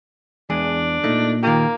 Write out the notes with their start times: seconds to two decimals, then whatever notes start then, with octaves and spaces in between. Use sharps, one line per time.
0.50 E2 G#3 D4 G#4
1.04 A#2 A3 D#4
1.43 D#3 A#3 F4 G4